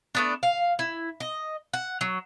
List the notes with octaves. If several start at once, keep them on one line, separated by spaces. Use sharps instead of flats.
A3 B3 D4
F5
E4
D#5
F#5
F#3